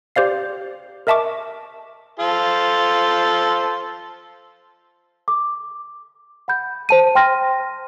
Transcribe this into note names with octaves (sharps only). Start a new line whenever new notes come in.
G4 C5 D5 F5 C7
A#4 D#5 E5 A5 C#6 D6
F4 A4 C5
D6
F#5 B5 G6
C5 A5 D#7
G5 C6 F6 A#6